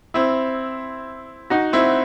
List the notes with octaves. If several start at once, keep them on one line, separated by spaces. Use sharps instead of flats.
C4 E4
D#4 F#4
C4 E4